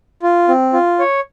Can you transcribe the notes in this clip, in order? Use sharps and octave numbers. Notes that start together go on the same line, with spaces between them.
F4
C4
F4
C#5